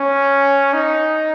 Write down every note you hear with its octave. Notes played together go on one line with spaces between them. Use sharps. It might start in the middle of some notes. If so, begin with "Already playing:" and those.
Already playing: C#4
D#4